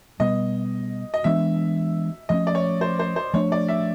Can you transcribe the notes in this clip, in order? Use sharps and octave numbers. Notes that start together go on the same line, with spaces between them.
B2 G3 B3 D#5
D#5
E3 G#3 B3 D4 E5
F3 A3 C#4 D#5
D5
C#5
C5
C5
C5
F3 A3 D4 C#5
D5
E5